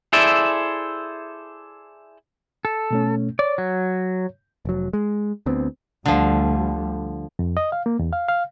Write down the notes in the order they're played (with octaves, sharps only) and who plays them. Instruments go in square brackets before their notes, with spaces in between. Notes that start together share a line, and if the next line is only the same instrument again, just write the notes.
[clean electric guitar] E4 G#4 A4 C5 D5 E5
[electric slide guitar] A4
[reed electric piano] B2 A3 C#4
[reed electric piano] C#5 [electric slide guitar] D5
[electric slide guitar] F#3
[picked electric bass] F1 F#3
G#3
D2 B3 C4
[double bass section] D2 G3 [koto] D3 F3
[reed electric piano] F2
D#5
F5
A#3
E2
F5
F5